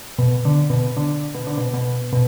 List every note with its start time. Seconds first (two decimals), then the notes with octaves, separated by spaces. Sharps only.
0.19 B2
0.45 D3
0.70 B2
0.97 D3
1.35 B2
1.47 D3
1.57 B2
1.74 B2
2.13 B2